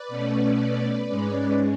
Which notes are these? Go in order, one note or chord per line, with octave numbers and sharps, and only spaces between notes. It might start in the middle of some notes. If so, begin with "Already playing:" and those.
Already playing: B4 D5
B2 A3 C#4
G#2 G#3 C#4